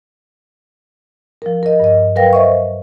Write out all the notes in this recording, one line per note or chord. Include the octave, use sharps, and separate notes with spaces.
F3 A#4
A#4 D#5
G2 D#5
F#3 A#4 B4 F5 G5 A#6
C5 D#5 E5 C#6